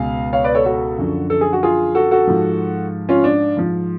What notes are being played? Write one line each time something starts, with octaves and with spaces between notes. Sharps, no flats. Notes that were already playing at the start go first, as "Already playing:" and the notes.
Already playing: C#2 B2 F5 G#5
C#5 F5
B4 D5
A4 C#5
F#4 A4
F#2 D3 F3
A4
G#4
F#4
F4 G#4
F#4 A4
F#4 A4
G#2 F3
C#4 F4
D4
G#2 F3